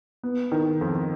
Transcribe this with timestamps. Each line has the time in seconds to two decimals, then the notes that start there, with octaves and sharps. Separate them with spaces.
0.23 B3
0.52 D#3
0.81 F2